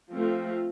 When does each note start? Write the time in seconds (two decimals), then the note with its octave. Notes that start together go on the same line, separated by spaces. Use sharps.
0.11 F3 A3 C4 F4